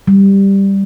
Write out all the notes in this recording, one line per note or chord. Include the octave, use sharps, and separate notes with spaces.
G3